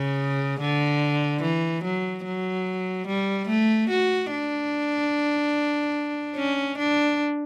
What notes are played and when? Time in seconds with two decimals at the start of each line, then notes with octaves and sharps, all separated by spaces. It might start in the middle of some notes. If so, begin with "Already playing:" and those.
Already playing: C#3
0.59 D3
1.42 E3
1.84 F#3
2.25 F#3
3.07 G3
3.48 A3
3.90 F#4
4.31 D4
6.36 C#4
6.78 D4